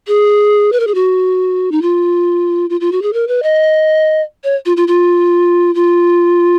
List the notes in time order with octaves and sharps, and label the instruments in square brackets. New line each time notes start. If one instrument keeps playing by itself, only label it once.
[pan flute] G#4
B4
A#4
G#4
F#4
D#4
F4
F4
F4
F#4
G#4
A#4
B4
D#5
C#5
F4
F4
F4
F4